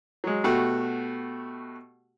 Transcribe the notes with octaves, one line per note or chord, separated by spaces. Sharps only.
F#3 G#3
B2 A3 F#4 G4